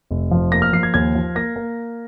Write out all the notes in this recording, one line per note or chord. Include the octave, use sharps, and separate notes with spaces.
F1
F3
A#3 A#6
F6
F3 C7
G#6
D#2 G#6
F3
A#3 A#6
A#3